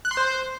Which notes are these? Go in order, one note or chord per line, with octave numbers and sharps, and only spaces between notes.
F#6
C6
C5